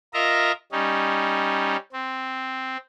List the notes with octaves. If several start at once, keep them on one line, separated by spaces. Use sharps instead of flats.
F4 A#4 D#5 E5 A#5
G3 C#4 D#4
C4